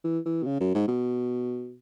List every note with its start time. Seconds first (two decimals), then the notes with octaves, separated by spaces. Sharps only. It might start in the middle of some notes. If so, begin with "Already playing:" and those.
0.04 E3
0.26 E3
0.43 B2
0.46 C#3
0.60 F#2
0.75 G#2
0.88 B2